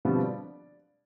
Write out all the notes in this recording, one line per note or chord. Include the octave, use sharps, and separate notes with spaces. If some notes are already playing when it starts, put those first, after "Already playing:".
B2 D3 F3 G3 B3 C4
D5